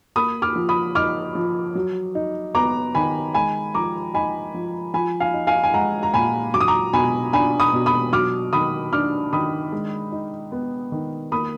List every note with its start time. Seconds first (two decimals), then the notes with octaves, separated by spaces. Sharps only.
0.16 A#3 B5 D#6
0.42 D6 F6
0.56 F3
0.69 B5 D#6
0.95 D#4 D6 F6
1.35 F3
1.75 F#3
2.15 D#4
2.55 B3 A#5 D6
2.95 D#3 G#5 B5
3.34 G#3 G#5 B5
3.74 F3 A#5 D6
4.14 D#4 G#5 B5
4.54 F3
4.94 F3 G#5 B5
5.20 F5 G#5
5.34 D#4
5.47 F5 G#5
5.63 G#5
5.74 G#3 F#5 A#5
6.03 A#5
6.14 A#2 G#5 B5
6.54 F#3 D6
6.61 D#6
6.68 A#5 D6
6.93 B2 G#5 B5
7.33 D4 G#5 B5
7.60 B5 D#6
7.73 B2
7.86 B5 D#6
8.13 F#3 D6 F6
8.53 D#3 B5 D#6
8.93 D4 D6 F6
9.33 D#3 B5 D#6
9.72 G#3
10.12 D#4
10.52 B3
10.92 D#3
11.32 A#3 B5 D#6